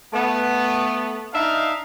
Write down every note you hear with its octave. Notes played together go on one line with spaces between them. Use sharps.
A3 B3
D4 D#4 E5 F5